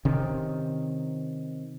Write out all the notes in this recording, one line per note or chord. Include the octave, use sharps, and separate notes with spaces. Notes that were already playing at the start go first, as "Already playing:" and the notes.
C3 D#3 C#4